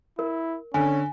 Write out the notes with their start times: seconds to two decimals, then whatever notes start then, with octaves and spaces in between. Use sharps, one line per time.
0.19 E4 A#4
0.74 D3 C#4 G#5